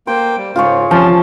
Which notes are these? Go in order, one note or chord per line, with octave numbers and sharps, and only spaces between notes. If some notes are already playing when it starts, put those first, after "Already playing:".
A#3 C5 G5
G3
G#2 C#3 F4 G#4 C#5
C3 F3 C#4 A5